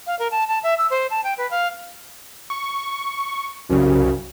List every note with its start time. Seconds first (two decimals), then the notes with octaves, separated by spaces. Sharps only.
0.07 F5
0.19 A#4
0.31 A5
0.48 A5
0.63 E5
0.78 E6
0.90 C5
1.10 A5
1.24 G5
1.38 B4
1.51 F5
2.50 C#6
3.70 C2 F#2 C#3